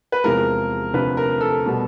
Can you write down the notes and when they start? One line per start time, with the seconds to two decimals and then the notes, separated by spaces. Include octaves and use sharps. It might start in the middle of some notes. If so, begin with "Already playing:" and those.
0.12 B4
0.24 E2 C3 F3 G#3 A#4
0.94 D2 C3 F3 B4
1.17 A#4
1.41 A4
1.66 B2 G3 B3